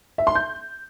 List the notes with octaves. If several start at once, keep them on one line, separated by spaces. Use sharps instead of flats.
E5
C6
G6